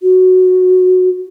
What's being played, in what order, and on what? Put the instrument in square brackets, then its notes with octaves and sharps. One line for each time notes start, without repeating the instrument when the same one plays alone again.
[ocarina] F#4